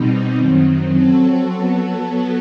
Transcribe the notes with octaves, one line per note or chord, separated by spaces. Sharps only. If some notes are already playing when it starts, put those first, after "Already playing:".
Already playing: B2 G3 C4 D#4
F#2 D#3 F#3 C4
F#3 C4 F#4 A4
F#3 B3 F#4 A4